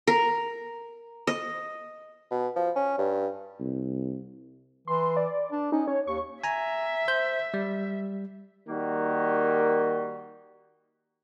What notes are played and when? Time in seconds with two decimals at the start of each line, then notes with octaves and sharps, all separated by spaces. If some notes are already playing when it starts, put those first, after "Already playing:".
0.07 A#4
1.27 D#5
2.31 B2
2.56 F3
2.76 C#4
2.98 G2
3.60 C2
4.88 E3 C6
5.17 D5
5.51 D4
5.72 C#4 D#4
5.88 C#4 C#5
6.07 D#2 C#6
6.44 E5 G#5 A#5
7.08 C5 G6
7.54 G3
8.68 D#3 G3 A#3 F#4